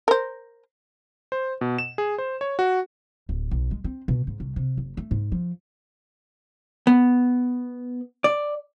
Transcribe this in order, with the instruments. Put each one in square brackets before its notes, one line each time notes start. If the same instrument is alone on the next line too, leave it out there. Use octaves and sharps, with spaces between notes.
[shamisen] A#4 C5
[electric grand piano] C5
B2
E7
G#4
C5
C#5
F#4
[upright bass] D1
B1
G#3
C4
B2
G#2
C2
C3
F#1
A3
G#2
F3
[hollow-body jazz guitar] B3
D5